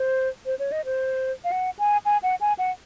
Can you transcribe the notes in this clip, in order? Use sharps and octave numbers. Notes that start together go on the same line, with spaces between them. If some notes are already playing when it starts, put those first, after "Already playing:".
Already playing: C5
C5
C#5
D#5
C5
F5
F#5
G#5
G#5
F#5
G#5
F#5